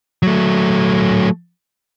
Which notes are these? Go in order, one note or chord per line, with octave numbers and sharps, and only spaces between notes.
F#3 A3